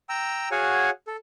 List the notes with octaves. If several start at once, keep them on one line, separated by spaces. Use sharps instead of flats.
G5 A#5 E6
F#4 G#4 C#5 F5 F#5 G#5
A4